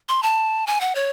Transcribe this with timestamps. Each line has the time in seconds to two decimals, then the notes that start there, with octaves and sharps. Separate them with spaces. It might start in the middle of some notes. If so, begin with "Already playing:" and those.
0.09 C6
0.23 A5
0.67 G#5
0.81 F#5
0.95 C#5